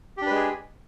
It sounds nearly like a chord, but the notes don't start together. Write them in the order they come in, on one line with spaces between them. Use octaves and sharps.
G4 D4 B4 G#3 G#4